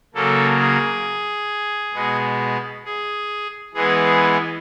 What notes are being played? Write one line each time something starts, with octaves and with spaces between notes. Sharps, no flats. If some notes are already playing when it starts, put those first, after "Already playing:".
C#3 F#3 A#3 A4
G#4
B2 G#3 B3
G#4
E3 G#3 B3 G#4
G#4